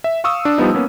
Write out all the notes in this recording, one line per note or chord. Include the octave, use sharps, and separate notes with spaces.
E5
F5 C#6 D#6 E6
D4
F3 G3 B3 D#4
A#3 B3 C#4